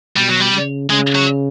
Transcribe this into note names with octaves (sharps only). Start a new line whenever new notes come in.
B2 G3
F#3
G3
C#3
C#3 G#3
F#3